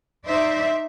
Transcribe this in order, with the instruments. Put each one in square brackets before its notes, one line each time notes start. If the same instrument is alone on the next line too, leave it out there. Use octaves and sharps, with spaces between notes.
[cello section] D#4 C5 D5 E5